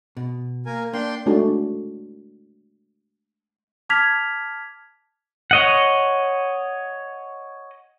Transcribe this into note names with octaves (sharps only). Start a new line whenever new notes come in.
B2
A#3 A#4 G#5
A#3 D4 G5 C6
G#3 A3 D4 D#4 F#4 A4
A5 D6 F6 G#6 B6 F7
C#5 D#5 F#5